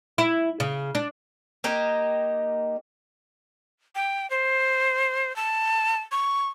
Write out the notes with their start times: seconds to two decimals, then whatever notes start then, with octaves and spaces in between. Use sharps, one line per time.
0.18 E4
0.60 C#3
0.95 D4
1.64 A#3 D#4 G4 D#5
3.95 G5
4.30 C5
5.36 A5
6.12 C#6